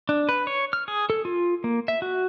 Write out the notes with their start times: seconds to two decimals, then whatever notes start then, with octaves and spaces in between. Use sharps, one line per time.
0.09 D4
0.29 B4
0.47 C#5
0.73 F6
0.88 G#4
1.10 A4
1.25 F4
1.64 A#3
1.88 E5
2.02 F#4